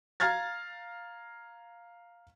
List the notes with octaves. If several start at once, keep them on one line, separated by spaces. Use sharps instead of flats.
F5 A#5 F6 G#6 A6